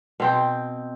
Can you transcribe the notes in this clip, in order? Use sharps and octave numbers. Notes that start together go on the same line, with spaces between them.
B2 C4 G5